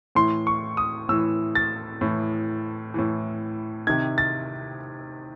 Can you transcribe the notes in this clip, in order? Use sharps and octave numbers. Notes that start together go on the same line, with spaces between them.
A2 E3 C6
C#6
D#6
A2 E3 E6
A6
A2 E3
A2 E3
C3 D#3 G#6
A6